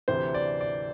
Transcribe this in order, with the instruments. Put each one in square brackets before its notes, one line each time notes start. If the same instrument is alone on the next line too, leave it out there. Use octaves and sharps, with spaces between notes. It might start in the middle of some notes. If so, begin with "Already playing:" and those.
[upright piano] D2 C3 E3 C5
D5
D5